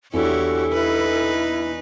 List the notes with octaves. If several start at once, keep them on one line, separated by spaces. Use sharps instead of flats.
E2 D4 E4 F#4 G4 A4 C#5
D#4 E4 B4